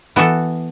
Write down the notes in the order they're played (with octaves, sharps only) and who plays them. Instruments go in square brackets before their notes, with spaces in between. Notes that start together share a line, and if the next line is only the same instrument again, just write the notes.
[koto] E3 B3 F#4 A4